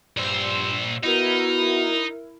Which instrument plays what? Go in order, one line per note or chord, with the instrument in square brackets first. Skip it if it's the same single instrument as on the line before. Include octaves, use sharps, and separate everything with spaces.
[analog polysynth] G2 E6 [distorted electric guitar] A#2 C5
[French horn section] B3 F#4 [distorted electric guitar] D#4 [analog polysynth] E4 A#4